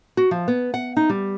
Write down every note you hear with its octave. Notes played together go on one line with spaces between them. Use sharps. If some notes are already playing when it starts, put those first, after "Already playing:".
F#4
F3
B3
F#5
D#4
G3